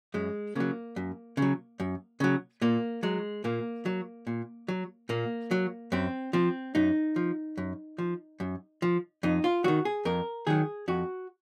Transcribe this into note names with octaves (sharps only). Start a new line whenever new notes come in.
F#2 G#3
C#3 F#3 A#3
F#2
C#3 F#3
F#2
C#3 F#3
A#2 A#3
F#3 G#3
A#2 A#3
F#3
A#2
F#3
A#2 A#3
F#3
F#2 C4
F3 C4
F#2 D#4
F3
F#2
F3
F#2
F3
F2 D#4
F4
D#3 F#3 F#4
G#4
F2 A#4
D#3 F#3 G#4
F2 F#4